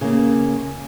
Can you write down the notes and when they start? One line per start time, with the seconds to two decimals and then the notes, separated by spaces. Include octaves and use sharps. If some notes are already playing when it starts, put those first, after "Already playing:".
0.01 C#3 A#3